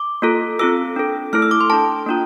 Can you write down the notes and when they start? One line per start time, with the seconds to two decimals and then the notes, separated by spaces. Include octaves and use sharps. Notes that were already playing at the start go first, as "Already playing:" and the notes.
Already playing: D6
0.22 A#3 F4 A4
0.59 C4 F4 A4 E6
0.96 D4 A4
1.33 A3 E4 A4 F6
1.42 E6
1.51 D6
1.61 C6
1.70 D4 A4 A5
2.06 A#3 D4 F4